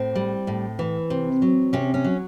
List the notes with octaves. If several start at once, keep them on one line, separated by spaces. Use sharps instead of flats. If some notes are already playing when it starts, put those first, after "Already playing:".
Already playing: A2 C4
G3
A2
E3
C3
F#3
C3 C#4
C#4
F#3